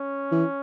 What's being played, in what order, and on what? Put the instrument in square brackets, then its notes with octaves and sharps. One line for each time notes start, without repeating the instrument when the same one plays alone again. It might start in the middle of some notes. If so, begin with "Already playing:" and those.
Already playing: [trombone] C#4
[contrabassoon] E3